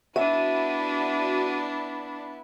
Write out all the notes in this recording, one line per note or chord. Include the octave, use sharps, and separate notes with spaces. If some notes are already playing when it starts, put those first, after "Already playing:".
B3 D4 E4 F#4 E5 D#7